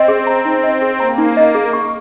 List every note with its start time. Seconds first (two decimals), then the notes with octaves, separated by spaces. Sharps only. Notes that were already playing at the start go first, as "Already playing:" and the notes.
Already playing: C4 D#5
0.08 G#4
0.27 A#5
0.45 D#4
0.63 D#5
0.81 G#4
1.00 A#3 A#5
1.18 D#4
1.37 D#5
1.55 G#4
1.73 C#6